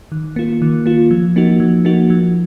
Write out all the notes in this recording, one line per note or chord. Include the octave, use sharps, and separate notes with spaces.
D#3
A#3 F4
D#3
A#3 F4
F3
A#3 D#4 F#4
F3
A#3 D#4 F#4
F3